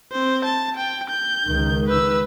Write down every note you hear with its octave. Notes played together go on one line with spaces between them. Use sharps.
C4 C5
A5
G5
G6
C#2 D#3
B4 E6